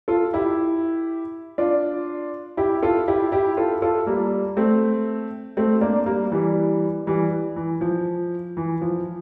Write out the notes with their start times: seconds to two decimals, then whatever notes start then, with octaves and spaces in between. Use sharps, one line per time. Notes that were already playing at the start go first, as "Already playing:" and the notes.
0.08 F4 A4
0.33 E4 G4
1.58 D4 F4
2.57 E4 G4
2.83 F4 A4
3.08 E4 G4
3.32 E4 G4
3.57 F4 A4
3.82 F4 A4
4.07 G3 A#3
4.57 A3 C4
5.57 A3 C4
5.81 A#3 D4
6.06 G3 A#3
6.32 E3 G3
7.07 E3 G3
7.56 E3
7.81 F3
8.57 E3
8.81 F3